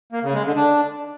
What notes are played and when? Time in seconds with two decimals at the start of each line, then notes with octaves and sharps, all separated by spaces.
0.13 A#3
0.23 C#3
0.34 G#3
0.45 D3
0.56 D4